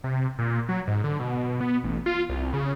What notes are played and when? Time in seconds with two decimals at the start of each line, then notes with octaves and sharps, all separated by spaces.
0.04 C3
0.39 A#2
0.69 F#3
0.88 G#2
1.04 D3
1.19 B2
1.61 B3
1.84 A1
2.06 F4
2.29 C2
2.54 C#3